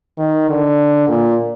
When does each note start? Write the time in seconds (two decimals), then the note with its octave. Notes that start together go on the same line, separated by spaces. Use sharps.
0.18 D#3
0.49 D3
1.08 A#2